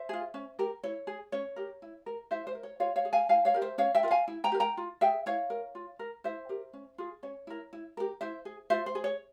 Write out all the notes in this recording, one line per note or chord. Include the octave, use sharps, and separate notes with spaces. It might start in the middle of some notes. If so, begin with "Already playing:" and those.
Already playing: C5 E5
F4 G#4
C#4
G4 A#4
E4 C#5
G#4
C#4 C#5
G4 A#4
E4
A#4
E4 C5 E5
C5 E5
A#4
C#5
F4 C#5 F5
C#5 F5
G#4
F5 G#5
E4 F5 G#5
C#5 F5
G4 A#4
C5 E5
C#4 C#5 F5
E5 G5
F4 A#4
F5 G#5
E4
G5 A#5
G4 A#4
G5 A#5
F4
G#4 E5 G5
E4 C#5 F5
A#4
F4
A#4
E4 C5 E5
G4 A#4
C#4
F4 G#4
C#4 C#5
E4 A#4
E4
G4 A#4
E4 C5 E5
G#4
F4 C5 E5
C5
G#4
C#5